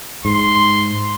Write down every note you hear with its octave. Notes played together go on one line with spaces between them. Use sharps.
G#2 C6